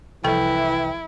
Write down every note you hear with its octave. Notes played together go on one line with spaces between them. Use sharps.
C2 E3 F3 E4 A4 G5